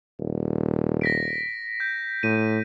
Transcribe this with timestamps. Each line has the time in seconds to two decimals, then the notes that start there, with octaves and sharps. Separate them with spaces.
0.20 D#1
1.01 A#6 B6 D7
1.80 G6
2.23 A2 D#7